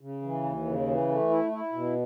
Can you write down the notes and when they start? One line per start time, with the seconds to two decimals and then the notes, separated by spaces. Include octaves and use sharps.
0.01 C#3
0.22 E3
0.43 D#2
0.66 C#3
0.87 E3
1.08 A3
1.30 E4
1.52 E4
1.73 B2